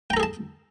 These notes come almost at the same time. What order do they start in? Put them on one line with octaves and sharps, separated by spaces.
G5 A#5 A4 G#4 A5